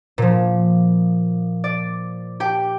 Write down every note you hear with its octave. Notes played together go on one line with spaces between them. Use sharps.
A#2 F3
D5
G4 G5